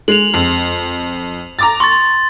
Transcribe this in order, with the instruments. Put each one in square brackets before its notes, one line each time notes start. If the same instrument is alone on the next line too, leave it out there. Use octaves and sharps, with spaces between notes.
[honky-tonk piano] G#3 [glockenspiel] F7 F#7
[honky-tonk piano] F2
A#5 D6 A6
[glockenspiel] C6 A6 [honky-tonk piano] C#6